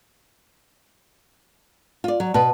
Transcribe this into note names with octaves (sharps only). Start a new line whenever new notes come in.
F4 D5
F#3
B2 B4 A5